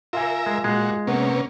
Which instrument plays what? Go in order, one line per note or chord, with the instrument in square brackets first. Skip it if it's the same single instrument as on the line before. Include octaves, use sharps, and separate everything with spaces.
[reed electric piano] F4 F5 G#5 [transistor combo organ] A#4 E5
[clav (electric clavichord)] G#3
[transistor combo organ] A#2 F#4 [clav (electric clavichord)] G#3
[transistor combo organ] C3 A#3 C#4 [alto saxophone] B3